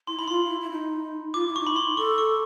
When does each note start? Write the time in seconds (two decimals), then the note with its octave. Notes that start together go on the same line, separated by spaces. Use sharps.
0.07 E4 C6
0.19 E4 B5
0.28 F4 C6
0.46 F4
0.50 E4
0.61 E4
0.71 D#4
1.34 F4 D6
1.47 E4
1.56 C#6
1.59 D#4
1.67 B5
1.72 E4 C6
1.97 A4 C#6
2.18 C#6